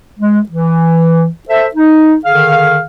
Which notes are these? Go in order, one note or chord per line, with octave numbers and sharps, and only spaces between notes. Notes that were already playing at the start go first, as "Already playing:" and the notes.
G#3
E3
A4 C5 E5
D#4
D3 D#3 G#4 F5